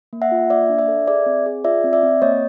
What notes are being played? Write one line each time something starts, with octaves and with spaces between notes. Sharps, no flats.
A#3
E5 F#5
F4
A#3 D5 E5
D4
D5 E5
A4
G#4 D5 E5
C4
G#4
F4 D5 E5
C4
D5 E5
C4
A#3 C#5 D#5